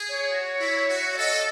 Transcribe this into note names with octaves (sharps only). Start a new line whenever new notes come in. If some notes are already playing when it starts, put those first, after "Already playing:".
Already playing: G#4
C#5
F#4
E4
F#4
A4 D#5 F#5